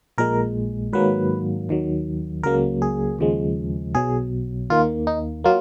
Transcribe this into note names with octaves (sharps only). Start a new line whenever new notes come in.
A#1 A#2 G#3 A#4
G#2 D#3 F#3 A#3 B4
D#2 D#3 F#3
C#2 C#3 F#3 A#3 A#4
G#4
D#2 C#3 F3 G#3
B1 B2 F#3 G#4
D#2 D#3 A#3 F4
D#4
F#3 A#3 F4